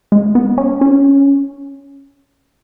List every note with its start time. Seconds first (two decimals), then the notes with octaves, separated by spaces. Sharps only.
0.12 G#3
0.35 B3
0.58 C#4
0.81 C#4